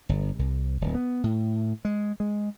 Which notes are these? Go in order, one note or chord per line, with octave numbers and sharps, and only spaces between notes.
G1
C2
D1
B3
A2
G#3
G#3